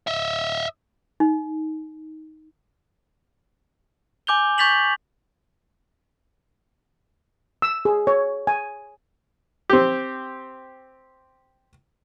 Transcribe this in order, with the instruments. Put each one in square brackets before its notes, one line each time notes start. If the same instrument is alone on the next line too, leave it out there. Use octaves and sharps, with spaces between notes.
[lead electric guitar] D#5 E5
[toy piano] D#4
[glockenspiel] G#5 D6 G6 F7 G7
C#6 G6 A6 B6 F7 F#7
[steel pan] E6
G#4
C#5
G#5
[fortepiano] C4 G4